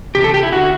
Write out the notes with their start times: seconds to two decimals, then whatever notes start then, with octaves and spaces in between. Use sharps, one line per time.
0.15 E2 C3 G4
0.24 A4
0.34 G4
0.43 E4
0.52 D3 F#4